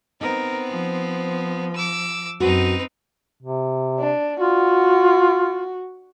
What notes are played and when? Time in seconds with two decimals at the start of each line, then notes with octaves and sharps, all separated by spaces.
0.21 B3 C4 D#4 A#4
0.69 F3
1.76 D6 E6
2.40 F#2 C4 D#4 F#4 B4
3.43 C3
3.99 D4
4.40 F4 F#4